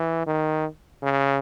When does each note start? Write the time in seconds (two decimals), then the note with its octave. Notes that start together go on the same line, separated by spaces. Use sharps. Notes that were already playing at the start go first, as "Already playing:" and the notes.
Already playing: E3
0.27 D#3
1.03 C#3